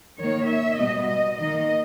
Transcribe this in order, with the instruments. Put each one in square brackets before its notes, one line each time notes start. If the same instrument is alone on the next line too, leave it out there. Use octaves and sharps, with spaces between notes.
[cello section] D#3 A#3 C#5
E5
B2 G3 B3 D#5
D#5
D#3 A#3 D#5